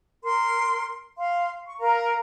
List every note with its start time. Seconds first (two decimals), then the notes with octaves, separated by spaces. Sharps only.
0.24 A#4 C6
1.17 F5 C6
1.65 C#6
1.79 A#4 F5 A#5